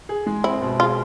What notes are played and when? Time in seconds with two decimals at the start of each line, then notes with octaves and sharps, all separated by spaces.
0.09 G#4
0.26 G#3
0.44 C4 E4
0.62 B2
0.80 F4 G#4